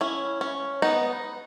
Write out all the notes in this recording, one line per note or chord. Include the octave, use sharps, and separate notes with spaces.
C#4 E4
C#4
B3 D#4